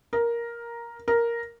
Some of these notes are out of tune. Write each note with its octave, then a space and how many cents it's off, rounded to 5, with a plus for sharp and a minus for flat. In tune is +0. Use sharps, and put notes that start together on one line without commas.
A#4 +5
A#4 +0